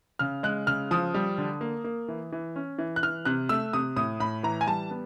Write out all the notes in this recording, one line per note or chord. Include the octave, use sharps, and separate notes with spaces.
C#3 F6
G#3 F#6
C#3 F6
F3 D#6
G3
D3
A#3
A#3
E3
E3
C#4
E3
F#6
E3 F6
C3 F#6
A3 E6
C3 D#6
A2 D#6
A2 B5
E3 A#5
G#5
G3 A5
B3